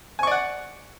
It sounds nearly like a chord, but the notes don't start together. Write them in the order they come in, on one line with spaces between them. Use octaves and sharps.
G#5 C#6 D5 F#5